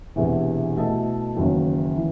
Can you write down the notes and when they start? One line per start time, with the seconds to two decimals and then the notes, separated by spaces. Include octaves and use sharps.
0.16 E1 E2 C3 E3
0.76 B2 A3 E4 A4 D#5
1.35 F#1 E2 D#3 F#3
1.97 E3